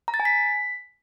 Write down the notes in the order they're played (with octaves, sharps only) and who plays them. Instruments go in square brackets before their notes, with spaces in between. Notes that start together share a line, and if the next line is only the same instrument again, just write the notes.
[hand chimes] A#5
A6
G#5
B6